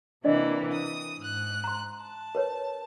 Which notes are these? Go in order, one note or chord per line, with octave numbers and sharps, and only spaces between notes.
C3 E3 A#3 D4 D5 D#5
D#6
G#2 F#6
A#5 C6
A5
A#4 B4 C#5